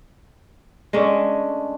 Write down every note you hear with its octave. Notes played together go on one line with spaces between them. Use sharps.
G#3 A3 C#4 D4